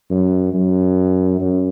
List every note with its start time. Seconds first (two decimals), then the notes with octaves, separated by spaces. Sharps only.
0.10 F#2
0.54 F#2
1.40 F#2